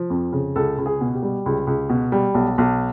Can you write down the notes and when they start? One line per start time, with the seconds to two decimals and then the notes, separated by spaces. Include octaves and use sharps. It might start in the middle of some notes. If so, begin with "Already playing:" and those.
Already playing: F3
0.10 F2
0.32 C#3
0.56 C#2 A4
0.78 C#2
0.86 G#4
1.01 B2
1.15 G4
1.22 G3
1.46 C#2
1.67 C#2
1.89 B2
2.12 G3
2.34 B1
2.58 B1